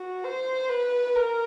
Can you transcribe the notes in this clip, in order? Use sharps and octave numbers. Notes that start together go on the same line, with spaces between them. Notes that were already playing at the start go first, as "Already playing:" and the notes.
Already playing: F#4
C5
B4
A#4